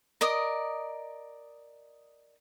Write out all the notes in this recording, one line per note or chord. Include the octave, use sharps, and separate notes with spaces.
A#4 D5 D#5 D#6